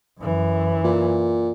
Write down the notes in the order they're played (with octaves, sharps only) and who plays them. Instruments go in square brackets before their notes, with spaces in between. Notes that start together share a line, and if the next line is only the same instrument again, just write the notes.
[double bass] F#2 E3
[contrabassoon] A#2